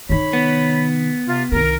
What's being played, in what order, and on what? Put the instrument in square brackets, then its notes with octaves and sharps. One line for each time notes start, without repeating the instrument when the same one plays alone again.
[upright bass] C3 D#3 [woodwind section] C#5 B5
[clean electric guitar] B3
[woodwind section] C3 F4
[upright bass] C2 D#3 [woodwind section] A#4